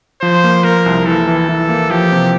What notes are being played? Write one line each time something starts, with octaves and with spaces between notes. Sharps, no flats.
F3 C5
A#3
A#3 A#4
C2
E3 A4
E3
E3
A#3
F3 G4
C3